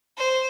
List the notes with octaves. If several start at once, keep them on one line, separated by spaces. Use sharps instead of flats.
C5